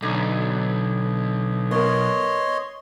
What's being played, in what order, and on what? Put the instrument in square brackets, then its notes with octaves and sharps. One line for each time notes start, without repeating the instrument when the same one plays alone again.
[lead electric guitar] B1 [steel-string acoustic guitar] D3
[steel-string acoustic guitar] B3 A#4 [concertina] C#5 D#5 C6